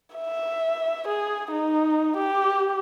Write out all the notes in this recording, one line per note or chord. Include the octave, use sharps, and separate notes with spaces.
E5
G#4
D#4
G4